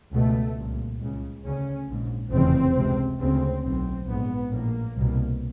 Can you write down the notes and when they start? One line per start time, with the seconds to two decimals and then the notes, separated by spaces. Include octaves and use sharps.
0.13 C#2 B2 A3
0.57 C2 A#2
1.00 C#2 C#3
1.44 D2 C#3 C#4
1.88 A#1 G#2
2.32 F1 E2 C#3 C4
2.76 C#2 C3
3.20 D2 C#3 C4
3.64 B1 A2 C4
4.08 A#1 G#2 B3
4.52 A#1 A2 A#3
4.96 C2 B2